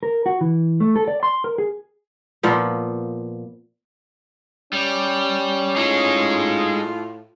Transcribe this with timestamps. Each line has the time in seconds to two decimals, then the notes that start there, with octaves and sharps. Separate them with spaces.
0.03 A#4
0.26 F#4
0.41 E3
0.80 A3
0.96 A4
1.08 D5
1.23 C6
1.44 A#4
1.58 G#4
2.43 A#2 F3 B3
4.73 G3 C#4
5.76 A2 G#3 D#4 F4